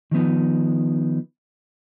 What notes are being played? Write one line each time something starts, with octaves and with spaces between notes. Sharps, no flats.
D#3 F3 B3 D#4